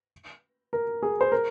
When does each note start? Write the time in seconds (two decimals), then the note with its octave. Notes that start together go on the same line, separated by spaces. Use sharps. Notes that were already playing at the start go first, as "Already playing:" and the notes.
0.73 A#4
1.03 G#4
1.21 C5
1.32 A#4